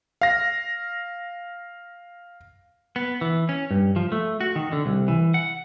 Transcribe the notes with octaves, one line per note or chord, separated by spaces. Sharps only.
F5 A#6
B3
E3
C#4
G2
F3
A3
F#4
D#3
D3
C2
E3
F#5